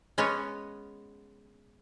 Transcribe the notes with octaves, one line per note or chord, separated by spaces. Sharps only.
G#3 B3 C#4 C#5